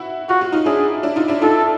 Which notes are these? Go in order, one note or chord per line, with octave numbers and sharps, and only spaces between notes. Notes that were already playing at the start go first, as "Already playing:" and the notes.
Already playing: E4 F#4
F4 F#4
F#4
D#4 F4
D4 E4 G#4
D4 E4
D#4 F4
D4 E4
D#4 F4 A4